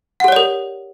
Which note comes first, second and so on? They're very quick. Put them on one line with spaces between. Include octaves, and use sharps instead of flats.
F#5 G4 C#5 D5 A#4